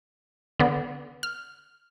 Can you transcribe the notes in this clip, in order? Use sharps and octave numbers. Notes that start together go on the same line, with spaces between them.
D3 B3
F6